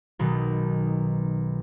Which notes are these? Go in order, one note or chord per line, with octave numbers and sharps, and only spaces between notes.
B1 B2 D#3